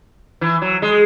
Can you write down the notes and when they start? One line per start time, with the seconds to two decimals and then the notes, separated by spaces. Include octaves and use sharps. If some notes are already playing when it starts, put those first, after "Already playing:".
0.41 E3
0.62 F#3
0.82 G#3